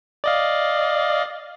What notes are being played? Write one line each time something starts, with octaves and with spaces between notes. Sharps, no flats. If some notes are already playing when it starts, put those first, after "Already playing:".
D5 D#5 F5